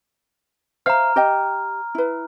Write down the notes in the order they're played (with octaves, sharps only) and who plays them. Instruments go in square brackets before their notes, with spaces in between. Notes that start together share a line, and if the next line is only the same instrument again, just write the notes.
[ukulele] C5 E5 F5 [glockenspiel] A#5 F6
[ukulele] G4 D#5 G5
E4 B4